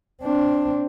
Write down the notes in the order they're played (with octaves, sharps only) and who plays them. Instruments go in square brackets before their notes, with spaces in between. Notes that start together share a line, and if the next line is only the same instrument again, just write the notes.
[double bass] C4 D4